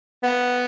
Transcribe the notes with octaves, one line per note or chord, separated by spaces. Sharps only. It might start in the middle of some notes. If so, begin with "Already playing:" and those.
B3